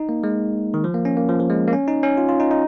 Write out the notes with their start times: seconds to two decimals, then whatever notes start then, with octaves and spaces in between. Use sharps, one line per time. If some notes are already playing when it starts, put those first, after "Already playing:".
Already playing: D#4
0.09 A#3
0.24 G#3
0.74 D#3
0.84 F3
0.94 A#3
1.05 C#4
1.17 A#3
1.29 F3
1.40 F3
1.50 G#3
1.68 A#3
1.73 C#4
1.88 D#4
2.03 C#4
2.17 F4
2.29 F4
2.40 D#4
2.51 D#4